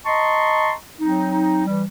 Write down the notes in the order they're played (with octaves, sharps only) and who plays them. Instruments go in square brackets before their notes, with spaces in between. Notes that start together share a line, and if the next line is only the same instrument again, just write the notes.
[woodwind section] D#5 A5 A#5 C6 C#6
F#3 C4 D#4
E3 G3